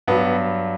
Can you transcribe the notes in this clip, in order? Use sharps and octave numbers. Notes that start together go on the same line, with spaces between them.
G2 F#3 B3